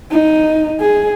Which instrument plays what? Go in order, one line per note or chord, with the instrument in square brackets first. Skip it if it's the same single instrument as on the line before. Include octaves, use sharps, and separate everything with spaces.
[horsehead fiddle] D#4
G#4